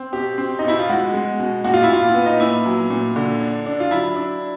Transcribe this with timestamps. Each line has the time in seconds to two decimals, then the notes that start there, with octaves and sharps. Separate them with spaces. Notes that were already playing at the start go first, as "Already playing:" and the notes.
Already playing: C4
0.13 B2 G4
0.38 C4
0.59 D#4
0.64 B2 E4
0.79 F4
0.89 G#3 F#4
1.14 G#3
1.39 B2
1.64 A#2 F#4
1.74 F4
1.83 E4
1.89 A#2 F4
2.14 B3
2.26 D#4
2.40 A#2 E4
2.65 F#3
2.90 A#2
3.16 D3
3.41 D4
3.66 D4
3.80 F4
3.91 F#3 E4
4.16 D4